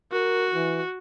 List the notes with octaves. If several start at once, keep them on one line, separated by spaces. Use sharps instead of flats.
F#4 A#4
E3